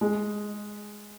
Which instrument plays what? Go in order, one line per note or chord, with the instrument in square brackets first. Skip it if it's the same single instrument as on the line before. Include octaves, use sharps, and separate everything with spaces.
[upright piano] G#3